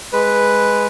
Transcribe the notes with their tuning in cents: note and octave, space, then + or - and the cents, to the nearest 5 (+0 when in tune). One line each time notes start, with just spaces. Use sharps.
G#3 +0 B4 +0